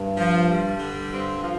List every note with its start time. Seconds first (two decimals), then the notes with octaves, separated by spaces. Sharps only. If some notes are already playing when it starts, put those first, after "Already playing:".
Already playing: G2
0.17 F3
0.49 G3
0.79 D3
1.10 G2 C4
1.42 F3